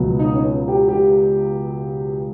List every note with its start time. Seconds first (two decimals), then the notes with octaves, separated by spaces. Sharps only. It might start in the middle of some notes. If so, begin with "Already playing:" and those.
Already playing: C#2 B2 F#3
0.19 D#4
0.34 C#4
0.68 G4
0.88 G4